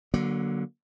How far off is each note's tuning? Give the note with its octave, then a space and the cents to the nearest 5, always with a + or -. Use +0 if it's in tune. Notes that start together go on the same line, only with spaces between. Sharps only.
D3 +0 F#3 +15 A#3 +35